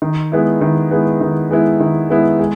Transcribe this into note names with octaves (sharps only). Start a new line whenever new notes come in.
D#3
G#3 B3 E4
D#3
G#3 B3 E4
D#3
G#3 B3 E4
D#3
G#3 B3 E4
G#3